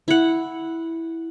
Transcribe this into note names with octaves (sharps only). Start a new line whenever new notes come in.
E4 F#5